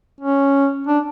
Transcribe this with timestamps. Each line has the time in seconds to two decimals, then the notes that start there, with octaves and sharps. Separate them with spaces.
0.21 C#4
0.87 D4